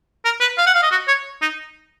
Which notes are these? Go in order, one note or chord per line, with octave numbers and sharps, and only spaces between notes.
A#4
B4
F5
F#5
F5
D#5
F#4
C#5
D#4